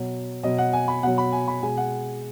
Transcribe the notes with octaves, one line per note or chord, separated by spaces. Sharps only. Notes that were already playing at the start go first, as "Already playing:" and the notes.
Already playing: B2 F#3
B2 F#3 D#5
F#5
G#5
B5
B2 F#3 F#5
B5
G#5
B5
B2 G#3 G#5
F#5